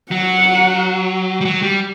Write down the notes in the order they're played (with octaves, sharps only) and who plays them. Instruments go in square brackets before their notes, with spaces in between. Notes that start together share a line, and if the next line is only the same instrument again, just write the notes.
[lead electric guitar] F#3 [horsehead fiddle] F#5
[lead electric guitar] G3
F#3
G3